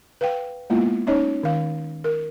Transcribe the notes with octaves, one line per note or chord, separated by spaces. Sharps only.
B4 F5 G5
G#3 A#3 B3 E4 F4
C#4 D#4 C#5 D#5
D#3 F5
A#4